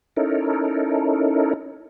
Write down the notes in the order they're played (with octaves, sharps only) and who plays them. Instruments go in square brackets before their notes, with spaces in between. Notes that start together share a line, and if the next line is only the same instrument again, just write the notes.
[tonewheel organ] C#4 D#4 E4 A4 A#4